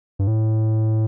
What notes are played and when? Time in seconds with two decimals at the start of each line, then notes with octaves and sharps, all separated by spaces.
0.19 G2
0.27 A2